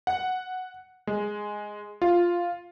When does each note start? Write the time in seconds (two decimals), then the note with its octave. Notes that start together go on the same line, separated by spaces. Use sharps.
0.07 F#5
1.07 G#3
2.02 F4